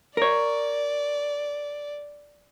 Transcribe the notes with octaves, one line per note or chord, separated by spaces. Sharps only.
A#4 C#5 D5